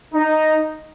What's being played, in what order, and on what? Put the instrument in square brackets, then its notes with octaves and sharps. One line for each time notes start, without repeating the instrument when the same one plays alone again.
[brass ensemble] D#4